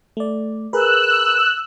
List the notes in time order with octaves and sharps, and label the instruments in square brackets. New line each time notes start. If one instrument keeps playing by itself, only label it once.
[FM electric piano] A3 D5
[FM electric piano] G#4 A#4 B4 [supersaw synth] E6 F#6